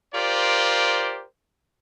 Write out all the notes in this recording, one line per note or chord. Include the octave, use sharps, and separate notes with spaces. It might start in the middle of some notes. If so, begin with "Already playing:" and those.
F4 G4 A#4 C5 D5